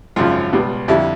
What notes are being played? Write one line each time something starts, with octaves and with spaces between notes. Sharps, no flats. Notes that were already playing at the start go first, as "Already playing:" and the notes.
G#1 F#2 C#3 F3 F4
C#2 B2 G3
F2 D3 G3 E4